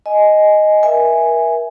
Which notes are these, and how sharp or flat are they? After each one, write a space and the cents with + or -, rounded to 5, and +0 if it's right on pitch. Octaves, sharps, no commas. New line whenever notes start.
D#5 +0 G#5 +10
A#4 +40 E5 +0 G#5 -5